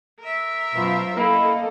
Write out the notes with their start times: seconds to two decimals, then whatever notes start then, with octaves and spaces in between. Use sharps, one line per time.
0.20 A#4 E5
0.75 F#2 B2 F4 C5
1.17 A#3 E4 A4 D#5